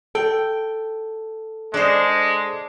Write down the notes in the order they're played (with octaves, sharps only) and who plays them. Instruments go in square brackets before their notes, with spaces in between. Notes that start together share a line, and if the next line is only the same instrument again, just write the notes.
[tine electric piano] A4 [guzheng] G5
[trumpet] G#3 [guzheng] D4 C5